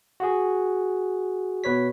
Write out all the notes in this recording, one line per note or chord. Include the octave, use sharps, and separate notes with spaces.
F#4 G#4
B2 B4 C#5 B6